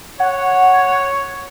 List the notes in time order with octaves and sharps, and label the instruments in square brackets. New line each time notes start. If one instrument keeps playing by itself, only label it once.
[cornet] C#5 [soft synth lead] F#5